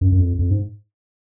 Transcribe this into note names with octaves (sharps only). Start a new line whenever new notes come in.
F#2
F#2
F2
F2
G#2